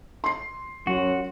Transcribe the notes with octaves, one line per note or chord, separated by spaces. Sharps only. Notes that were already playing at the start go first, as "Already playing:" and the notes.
C6 C7
F#2 F#4